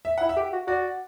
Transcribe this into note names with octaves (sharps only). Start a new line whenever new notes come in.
E5
E4 F#5
E5
G4
F#4
F#4 D5